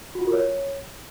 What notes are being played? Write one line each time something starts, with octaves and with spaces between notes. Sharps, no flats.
F#4
F4
A#4
C#5